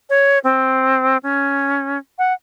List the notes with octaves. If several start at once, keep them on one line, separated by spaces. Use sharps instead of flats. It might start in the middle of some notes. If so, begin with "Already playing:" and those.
C#5
C4
C#4
F#5